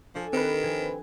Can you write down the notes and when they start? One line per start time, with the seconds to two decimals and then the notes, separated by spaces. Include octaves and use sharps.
0.15 F3 D4 A4 G#5
0.33 D#3 C4 G4 B4
0.63 F3 G#5 G#6